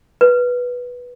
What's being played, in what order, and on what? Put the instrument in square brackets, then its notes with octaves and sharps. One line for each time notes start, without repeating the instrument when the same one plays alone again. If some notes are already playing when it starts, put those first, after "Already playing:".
[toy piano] B4